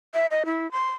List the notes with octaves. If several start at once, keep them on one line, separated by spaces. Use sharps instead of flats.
E5
D#5
E4
C6